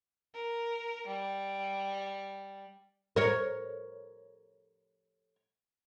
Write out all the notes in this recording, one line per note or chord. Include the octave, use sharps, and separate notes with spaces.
A#4
G3
A#4 C#5